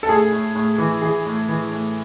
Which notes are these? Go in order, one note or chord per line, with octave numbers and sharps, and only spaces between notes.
A4
A2 G#4
A2
A2
E3
E3 G#4
A2
E3
A2